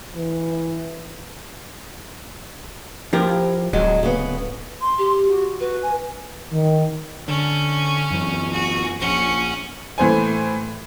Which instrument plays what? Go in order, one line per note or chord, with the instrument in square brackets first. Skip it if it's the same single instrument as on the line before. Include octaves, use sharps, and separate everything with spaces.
[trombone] E3
[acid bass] F3 [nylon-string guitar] E4 G4 A#4
[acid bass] D1 [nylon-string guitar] F#3 G#3
[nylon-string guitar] C#3 B3
[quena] C6
[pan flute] G4
[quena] F#4
[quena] F#4 [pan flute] B4
[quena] G#5
[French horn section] D#3
[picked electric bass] D3 [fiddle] C#4
[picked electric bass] F#2 E3
[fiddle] F#4 G#4
[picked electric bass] A#1 [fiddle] C#4 F#5
[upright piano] A2 E3 C5 G#5